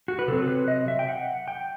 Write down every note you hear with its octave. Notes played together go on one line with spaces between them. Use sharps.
F#4
B4
C3 F#3 C4 A4
A4
B4
D#5
E5
G5
F#5
G5